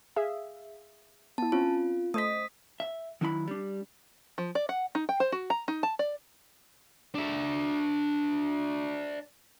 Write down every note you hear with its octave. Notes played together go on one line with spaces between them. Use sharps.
G#4 E5 F5
B3 E4 A5
C4 C#4 F4
A3 C5 D#5 D#6 B6
E5
D#3 F#3 D4 E4 D#5 B5
G3 D4
F3
D5
F#5
D#4
G5
C5
F#4
A#5
D#4
A5
D5
D4 E5